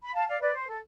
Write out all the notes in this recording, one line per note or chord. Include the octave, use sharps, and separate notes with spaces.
B5
F5 A5
D5 F5
B4 D5
C5
A4